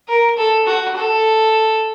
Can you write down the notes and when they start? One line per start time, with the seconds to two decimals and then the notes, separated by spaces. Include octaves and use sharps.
0.08 A#4
0.37 A4
0.67 F#4
0.96 A4